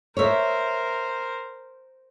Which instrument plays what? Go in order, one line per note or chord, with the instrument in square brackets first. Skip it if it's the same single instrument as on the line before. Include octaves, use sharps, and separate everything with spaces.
[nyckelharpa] A#4 C5 [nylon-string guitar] C#5 E5